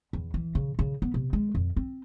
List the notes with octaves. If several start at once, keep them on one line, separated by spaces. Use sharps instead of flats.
E2
E3
C#3
C#3
B3
C3
G#3
F2
C4